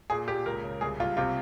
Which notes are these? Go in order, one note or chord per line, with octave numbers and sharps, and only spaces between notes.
A#2 G#4
A#2 G4
C#2 A#4
C#3
C2 G#4
C2 F4
C3 F4